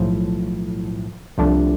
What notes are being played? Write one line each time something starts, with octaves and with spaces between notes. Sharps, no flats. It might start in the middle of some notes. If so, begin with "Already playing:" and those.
Already playing: B1 A2 F3
C2 C3 F3 A3 D4